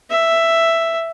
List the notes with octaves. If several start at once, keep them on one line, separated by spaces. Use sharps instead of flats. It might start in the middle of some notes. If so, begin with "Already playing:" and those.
E5